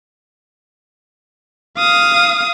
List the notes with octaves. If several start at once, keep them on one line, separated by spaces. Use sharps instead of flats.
F5 D#6